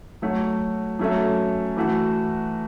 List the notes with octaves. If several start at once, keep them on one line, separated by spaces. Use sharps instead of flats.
F#3 A3 F#4 C#5
F#3 A3 C#4 A4 E5
E3 A3 F#4